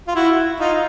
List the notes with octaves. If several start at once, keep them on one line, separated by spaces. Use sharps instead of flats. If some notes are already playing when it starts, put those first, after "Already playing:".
F4
E4 F#4
D#4 F4